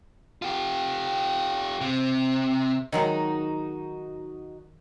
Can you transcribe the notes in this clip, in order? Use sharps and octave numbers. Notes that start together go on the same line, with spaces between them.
F4 G4
C3
D#3 F#3 G#3 D#4 F#4